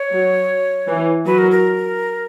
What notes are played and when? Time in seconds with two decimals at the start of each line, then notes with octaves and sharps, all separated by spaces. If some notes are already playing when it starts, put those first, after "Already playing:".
Already playing: C#5
0.12 F#3
0.88 E3
1.25 F#3 B4
1.38 A#4
1.51 A#4